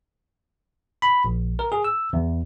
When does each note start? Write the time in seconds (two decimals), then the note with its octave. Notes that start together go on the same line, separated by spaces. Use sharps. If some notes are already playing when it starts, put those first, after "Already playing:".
1.02 B5
1.24 A#1
1.59 A#4
1.72 G#4
1.84 E6
2.13 E2